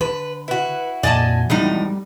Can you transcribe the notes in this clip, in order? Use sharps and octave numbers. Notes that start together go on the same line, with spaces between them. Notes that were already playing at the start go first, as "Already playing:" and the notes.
D3 B4
E4 F#4 B4
F2 A#2 D5 D#5 G#5 A5
E2 A2 F3 G3 G#3 C4 D#4